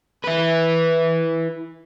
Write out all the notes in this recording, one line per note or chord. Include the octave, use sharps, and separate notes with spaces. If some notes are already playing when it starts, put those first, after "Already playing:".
E4 B4